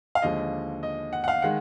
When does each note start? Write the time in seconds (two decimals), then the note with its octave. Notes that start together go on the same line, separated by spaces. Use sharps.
0.15 F5
0.22 D#2 D3 F3 G#3 D#5
0.83 D#5
1.13 F#5
1.24 F#5
1.28 F5
1.42 D#3 G#3 F#5